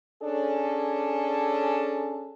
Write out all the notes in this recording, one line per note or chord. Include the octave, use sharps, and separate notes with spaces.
C#4 D4 G#4 A4